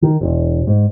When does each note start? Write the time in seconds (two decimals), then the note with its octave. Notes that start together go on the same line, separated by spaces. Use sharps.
0.02 D#3
0.21 E1
0.67 G#2